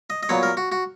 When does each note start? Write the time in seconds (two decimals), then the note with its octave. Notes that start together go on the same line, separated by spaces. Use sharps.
0.10 D#5
0.23 D#5
0.29 A#2 F#3 B3 C#5
0.43 A#4
0.57 F#4
0.72 F#4